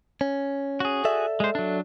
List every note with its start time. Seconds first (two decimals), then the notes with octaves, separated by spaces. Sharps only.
0.21 C#4
0.80 F#4 G#4
1.05 A4 D5 E5
1.40 G#3 C5
1.55 F#3 D4